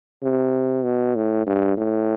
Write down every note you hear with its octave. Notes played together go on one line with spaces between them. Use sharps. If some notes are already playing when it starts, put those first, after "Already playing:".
C3
B2
A2
G2
A2